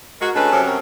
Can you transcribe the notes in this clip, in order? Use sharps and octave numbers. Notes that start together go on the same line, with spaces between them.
G#3 F#4 A#4
D2 G#3 C#4 A4 B4 A5
F#2 C3
C4 A#4 C#5